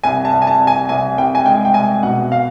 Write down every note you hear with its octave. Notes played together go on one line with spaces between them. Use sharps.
C2 G#5
A5
C2
G#5
A5
C2
G#5
C2 G#5
C2 G5
G#5
G#3 G5
G5
C2 G#5
B2 F#5
F5